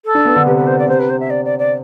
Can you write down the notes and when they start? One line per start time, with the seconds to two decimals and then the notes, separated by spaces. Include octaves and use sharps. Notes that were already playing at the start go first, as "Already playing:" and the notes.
0.05 A4
0.15 D4
0.25 B3
0.36 D3
0.46 C3 B4
0.57 B4
0.67 C5
0.78 D5
0.88 C3 C5
0.99 B4
1.10 C5
1.20 E5
1.30 D5
1.45 D5
1.59 D5